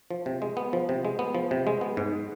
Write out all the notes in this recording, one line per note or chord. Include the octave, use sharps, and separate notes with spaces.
F3
C3
G#3
B3
F3
C3
G#3
B3
F3
C3
G#3
B3
G#2